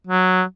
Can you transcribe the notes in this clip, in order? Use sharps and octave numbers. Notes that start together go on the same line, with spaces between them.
F#3